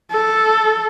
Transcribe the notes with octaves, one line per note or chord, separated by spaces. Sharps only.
A4